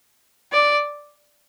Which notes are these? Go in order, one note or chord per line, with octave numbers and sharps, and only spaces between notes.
D5